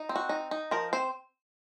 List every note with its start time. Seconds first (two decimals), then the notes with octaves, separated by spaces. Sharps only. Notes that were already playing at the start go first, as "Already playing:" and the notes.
Already playing: D#4
0.09 C4
0.16 F#4
0.29 D#4
0.51 D#4
0.71 F3 A#4
0.93 C4 C5